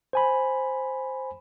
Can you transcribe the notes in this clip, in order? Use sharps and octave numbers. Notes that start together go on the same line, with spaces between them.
C5 G#5 B5